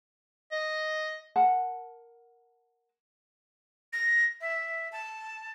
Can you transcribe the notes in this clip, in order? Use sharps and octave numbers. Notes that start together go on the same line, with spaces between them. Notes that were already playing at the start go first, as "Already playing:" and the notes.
D#5
A#4 F#5 A5
A#6
E5
A5